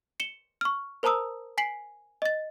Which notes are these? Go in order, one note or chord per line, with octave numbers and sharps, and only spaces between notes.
C#7 E7 G7
C#6 F6
A#4 C5 A5 A#5 D#6 E6
G#5 B6 C7 F#7
D#5 A6